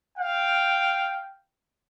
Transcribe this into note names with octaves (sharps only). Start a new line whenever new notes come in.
F5 G5